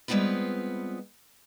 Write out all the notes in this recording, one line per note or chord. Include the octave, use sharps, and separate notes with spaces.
G3 G#3 B3 C4 F4 B4